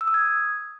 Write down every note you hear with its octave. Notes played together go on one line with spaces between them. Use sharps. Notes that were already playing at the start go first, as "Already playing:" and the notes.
E6
D#6
G#6